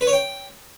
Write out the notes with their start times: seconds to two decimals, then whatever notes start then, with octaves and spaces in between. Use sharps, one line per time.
0.01 B4
0.07 C#5
0.13 G5